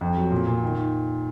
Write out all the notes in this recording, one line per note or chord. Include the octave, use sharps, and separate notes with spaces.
F2
F#3
A#2
A#2
D#3